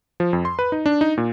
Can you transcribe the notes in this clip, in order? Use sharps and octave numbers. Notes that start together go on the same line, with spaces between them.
F3
F2
C6
B4
D#4
D4
D#4
A#2